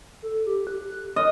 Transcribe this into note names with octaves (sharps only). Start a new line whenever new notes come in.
A4
G4
F#6
D#5 F6